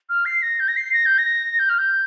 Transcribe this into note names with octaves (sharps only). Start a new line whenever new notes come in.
F6
C7
A#6
G6
A#6
C7
A#6
G6
A#6
G6
F6
G6